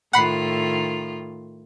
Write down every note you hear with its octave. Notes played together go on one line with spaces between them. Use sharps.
A2 D#3 F4 F#5 B5 C7